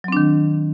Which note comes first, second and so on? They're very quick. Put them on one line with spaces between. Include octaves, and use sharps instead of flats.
F#3 C4 D4 D#3